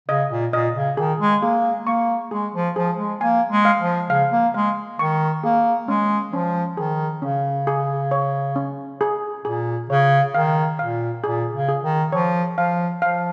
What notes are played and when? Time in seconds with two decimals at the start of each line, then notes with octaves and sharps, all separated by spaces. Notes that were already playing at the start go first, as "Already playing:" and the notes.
0.08 C#3 D#5
0.30 A#2
0.53 A#2 D#5
0.75 C#3
0.97 D#3 G#4
1.20 G#3
1.42 A#3 G#4
1.86 A#3 C#6
2.31 G#3 G#4
2.54 F3
2.76 F3 G#4
2.98 G#3
3.21 A#3 G#5
3.50 G#3
3.65 F5
3.80 F3
4.09 C#3 F5
4.32 A#3
4.54 G#3 F5
4.99 D#3 C#6
5.44 A#3 G#4
5.88 G#3 C#4
6.32 F3 C#4
6.77 D#3 G#4
7.22 C#3 C#4
7.67 G#4
8.11 C#5
8.56 C#4
9.01 G#4
9.45 A#2 G#4
9.90 C#3 C#5
10.34 D#3 F5
10.79 A#2 F5
11.24 A#2 G#4
11.53 C#3
11.68 G#4
11.83 D#3
12.12 F3 C#5
12.57 F3 F5
13.02 F3 F5